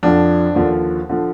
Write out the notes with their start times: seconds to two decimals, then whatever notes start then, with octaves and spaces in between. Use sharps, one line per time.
0.03 F2 D3 F3 D4
0.55 D#2 D3 F3
1.09 D3 F3